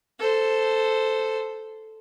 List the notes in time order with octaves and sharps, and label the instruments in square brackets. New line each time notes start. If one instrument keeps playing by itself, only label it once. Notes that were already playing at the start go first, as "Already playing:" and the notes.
[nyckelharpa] A4 C5